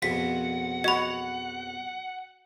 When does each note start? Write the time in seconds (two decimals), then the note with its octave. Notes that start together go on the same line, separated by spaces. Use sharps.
0.02 A#1 F2 B2 F#5 B6
0.84 F#4 D#5 B5